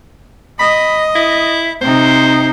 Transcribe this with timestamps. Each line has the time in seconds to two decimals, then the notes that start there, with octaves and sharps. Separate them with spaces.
0.59 D#5 B5
1.15 E4
1.81 C3 D#4 C5